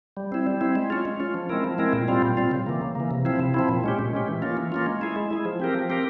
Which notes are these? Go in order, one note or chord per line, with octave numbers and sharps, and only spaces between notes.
G3
C4 E4
G3
C4 E4
G#3
C#4 F4
G#3
C#4 F4
F3
G#3 C4 E4 A#4
F3
G#3 C4 E4 A#4
A#2
G3 C4 F4
A#2
G3 C4 F4
C#3
E3 A#3
C#3
E3 A#3
C3
F3 C4 E4
C3
F3 C4 E4
A#2
G#3 C#4 G4
A#2
G#3 C#4 G4
E3
A#3 C#4 F4
E3
A#3 C#4 F4
G#3
E4 G#4
G#3
E4 G#4
F3
C4 G4 A#4
F3
C4 G4 A#4